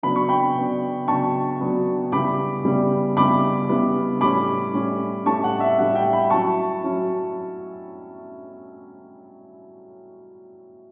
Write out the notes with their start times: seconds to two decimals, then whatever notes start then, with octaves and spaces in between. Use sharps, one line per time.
0.03 C#3 F#3 B3 D4 B5
0.16 C#6
0.29 G5 B5
0.55 C#3 F#3 B3 D4
1.08 C#3 F#3 B3 D4 A5 C#6
1.60 C#3 F#3 B3 D4
2.12 C#3 G3 B3 E4 B5 D6
2.65 C#3 G3 B3 E4
3.17 C#3 G3 B3 E4 B5 D6
3.69 C#3 G3 B3 E4
4.21 A2 G3 C#4 B5 D6
4.73 A2 G3 C#4
5.26 A2 G3 C#4 A5 C#6
5.44 F#5
5.60 E5
5.78 A2 G3 C#4 F#5
5.95 E5 G5
6.13 G5 B5
6.30 F#3 C#4 E4 A5 C#6
6.83 F#3 C#4 E4